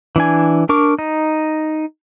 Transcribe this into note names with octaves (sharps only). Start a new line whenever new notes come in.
E3 D4 G#5
D4 A#4 C#6 D6
D#4